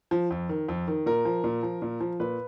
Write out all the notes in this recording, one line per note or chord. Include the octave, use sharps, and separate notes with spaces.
F3
F2
D#3
F2
D#3
A#2 A#4
F3
A#2
F3
A#2
F3
A#2 B4